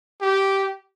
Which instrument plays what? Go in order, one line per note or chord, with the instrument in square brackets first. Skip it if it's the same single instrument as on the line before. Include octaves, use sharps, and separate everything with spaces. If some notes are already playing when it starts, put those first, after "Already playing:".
[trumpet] G4